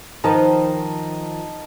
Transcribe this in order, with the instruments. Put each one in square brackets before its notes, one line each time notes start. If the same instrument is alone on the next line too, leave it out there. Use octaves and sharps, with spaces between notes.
[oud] D#3 F3 B4 [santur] D#4 D#5 A5